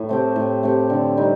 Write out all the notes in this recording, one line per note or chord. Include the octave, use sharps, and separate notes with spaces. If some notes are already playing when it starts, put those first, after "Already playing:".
Already playing: A2
A3 C4 G4
A2
A3 C4 G4
D3
G3 C4 D#4